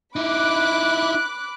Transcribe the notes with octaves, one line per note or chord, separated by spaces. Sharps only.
D#4 E4 B5 D6 F#6